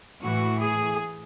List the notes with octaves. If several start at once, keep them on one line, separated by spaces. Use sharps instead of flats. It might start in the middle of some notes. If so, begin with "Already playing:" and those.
A2 E3 F#4
G#4